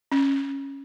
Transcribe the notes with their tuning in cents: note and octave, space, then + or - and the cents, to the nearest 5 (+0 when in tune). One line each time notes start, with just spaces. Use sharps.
C#4 -10